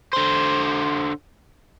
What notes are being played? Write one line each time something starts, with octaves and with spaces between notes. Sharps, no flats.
D3 C5